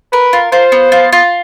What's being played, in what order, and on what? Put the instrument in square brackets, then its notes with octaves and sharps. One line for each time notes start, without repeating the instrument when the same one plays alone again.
[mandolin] A#4 [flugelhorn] B4
[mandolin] F4
[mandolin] F4 [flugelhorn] C5
[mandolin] B3
F4
F4